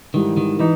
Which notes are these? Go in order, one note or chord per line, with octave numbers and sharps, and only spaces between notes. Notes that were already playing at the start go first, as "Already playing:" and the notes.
G#2 D#3 E3 G3
D#3
E3 D#4